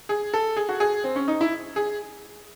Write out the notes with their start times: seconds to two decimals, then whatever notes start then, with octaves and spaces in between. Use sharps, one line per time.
0.09 G#4
0.34 A4
0.57 G#4
0.69 F#4
0.80 G#4
1.04 C4
1.16 C#4
1.28 D#4
1.41 E4
1.76 G#4